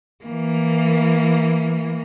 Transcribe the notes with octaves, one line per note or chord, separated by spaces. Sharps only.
E3 A#3